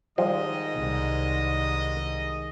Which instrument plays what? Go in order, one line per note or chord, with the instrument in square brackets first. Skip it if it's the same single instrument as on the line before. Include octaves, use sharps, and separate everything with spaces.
[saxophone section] G#2 D#3 [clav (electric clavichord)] F3 G3 [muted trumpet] D#5
[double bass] C2